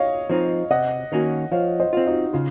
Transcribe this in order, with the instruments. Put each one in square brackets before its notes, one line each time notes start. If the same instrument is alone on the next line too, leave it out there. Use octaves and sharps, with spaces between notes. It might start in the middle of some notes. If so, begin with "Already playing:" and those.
Already playing: [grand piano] C#5 D#5 F5
[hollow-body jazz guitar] F3 C4 D#4
[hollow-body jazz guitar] C3 [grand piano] D#5 F#5
[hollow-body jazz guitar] D#3 A#3 C#4 F#4
[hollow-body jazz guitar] F3 [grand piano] C#5 F5
[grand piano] C5 D#5
[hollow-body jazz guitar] C4 F4
[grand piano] D#4 F#4
[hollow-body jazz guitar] C#3 [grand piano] F4